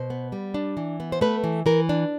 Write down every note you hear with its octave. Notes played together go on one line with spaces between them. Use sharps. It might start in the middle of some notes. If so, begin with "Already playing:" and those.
Already playing: B2 C5
B3
G3
D4
E3
B3
C5
A3 B4
E3
E3 A#4
D4